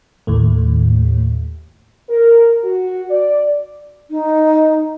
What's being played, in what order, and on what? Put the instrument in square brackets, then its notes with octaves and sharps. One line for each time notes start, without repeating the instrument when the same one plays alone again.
[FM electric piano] D#2 A2 A3
[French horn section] A#4
F#4
D5
[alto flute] D#4